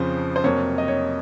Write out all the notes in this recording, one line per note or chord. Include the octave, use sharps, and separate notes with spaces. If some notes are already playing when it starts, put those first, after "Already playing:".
Already playing: F2 C#3 F3 C4 C5
C5
F2 C3 F#3 A#3 C#5
D#5
C#5